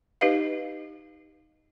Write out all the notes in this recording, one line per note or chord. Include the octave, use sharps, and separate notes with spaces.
D#4 G4 B4 D#5 F5